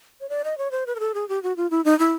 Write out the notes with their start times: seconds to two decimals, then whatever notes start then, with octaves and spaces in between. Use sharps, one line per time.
0.20 C#5
0.29 D5
0.44 D#5
0.58 C#5
0.71 C5
0.87 B4
0.95 A#4
1.00 A4
1.14 G#4
1.29 G4
1.43 F#4
1.57 F4
1.71 E4
1.85 D#4
1.99 E4